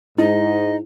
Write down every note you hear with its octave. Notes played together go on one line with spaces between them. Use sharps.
G#2 D#4 E4 D#5